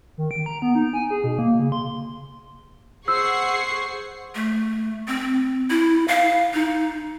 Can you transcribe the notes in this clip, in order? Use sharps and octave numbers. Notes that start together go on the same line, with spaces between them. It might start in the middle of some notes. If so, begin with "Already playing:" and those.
D#3
D7
A#5
B3
D#4
G#5
G#4
B2
A#3
C#3
C6
G#4 C5 F#5 C#6 E6 C7
A3
C4
E4
F5
D#4